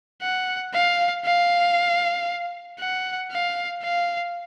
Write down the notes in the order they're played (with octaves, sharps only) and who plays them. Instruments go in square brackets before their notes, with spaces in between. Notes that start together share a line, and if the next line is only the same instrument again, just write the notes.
[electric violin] F#5
F5
F5
F#5
F5
F5